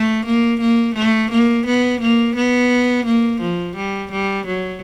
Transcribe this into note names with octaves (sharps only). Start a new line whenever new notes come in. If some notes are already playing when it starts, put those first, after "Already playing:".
Already playing: A3
A#3
A#3
A3
A#3
B3
A#3
B3
A#3
F3
G3
G3
F#3